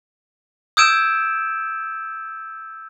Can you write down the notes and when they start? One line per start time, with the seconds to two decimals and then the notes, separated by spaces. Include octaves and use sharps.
0.77 D#6 E6 G6 G#6 D7 E7